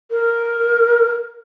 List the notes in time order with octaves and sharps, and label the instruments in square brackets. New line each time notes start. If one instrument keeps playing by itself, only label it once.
[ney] A#4